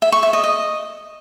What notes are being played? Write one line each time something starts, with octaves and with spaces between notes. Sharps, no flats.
E5
C#6
E5
D#5
D#5